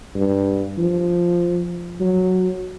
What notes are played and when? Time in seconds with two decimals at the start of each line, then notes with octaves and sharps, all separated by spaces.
0.16 G2
0.78 F3
2.00 F#3